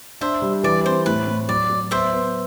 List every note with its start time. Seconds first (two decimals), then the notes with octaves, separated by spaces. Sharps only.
0.21 D4 C5 E5
0.42 G3
0.64 E3 D5
0.85 C4 C5
1.06 A2 B4
1.28 A2
1.49 F#3 D5
1.70 F#3
1.91 B3 C5 E5
2.13 B3